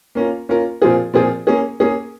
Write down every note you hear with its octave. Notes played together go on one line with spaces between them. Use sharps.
A#3 C#4 F4 A#4
A#3 C#4 F4 A#4
A#2 F3 C4 F4 G#4
A#2 F3 C4 F4 G#4
A#3 C#4 G#4
A#3 C#4 G#4